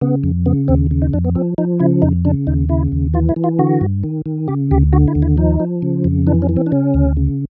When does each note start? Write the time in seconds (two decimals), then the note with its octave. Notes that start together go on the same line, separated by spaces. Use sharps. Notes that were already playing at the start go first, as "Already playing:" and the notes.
0.01 C#3 B3
0.24 F2
0.46 C#3 B3
0.68 D#2 C4
0.91 C#3
1.02 D#4
1.13 F2 D4
1.24 B3
1.35 F3 C4
1.58 F3 D#4
1.80 C#3 E4
2.02 F2 D#4
2.25 C#3 D4
2.47 D#2 D#4
2.69 C#3 E4
2.92 D#2
3.14 E3 F4
3.29 E4
3.36 E3
3.44 F4
3.59 D3 F#4
3.81 G2
4.03 D#3
4.26 D#3
4.48 C#3 G4
4.71 D2 G4
4.93 D3 F#4
5.08 E4
5.15 D#2
5.22 E4
5.37 F3 D#4
5.60 F3
5.82 C#3
6.04 F2
6.27 E3 D4
6.42 C#4
6.49 E3
6.57 C4
6.66 D4
6.72 C#3 C#4
6.94 D2
7.17 C#3